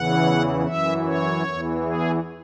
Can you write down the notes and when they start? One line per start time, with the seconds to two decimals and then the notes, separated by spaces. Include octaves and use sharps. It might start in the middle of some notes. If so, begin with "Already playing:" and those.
Already playing: E2 C#3 E3 F#5
0.66 F#2 E3 E5
1.06 C#5
1.45 E2 E3
1.84 G#4